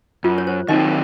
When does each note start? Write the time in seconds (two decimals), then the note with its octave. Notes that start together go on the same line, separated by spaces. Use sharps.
0.24 F#2 F4
0.38 C#5
0.47 C5
0.68 D#3 F#3 C4 D#4 D#5